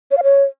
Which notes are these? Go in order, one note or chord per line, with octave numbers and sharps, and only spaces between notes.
C#5
F5
C#5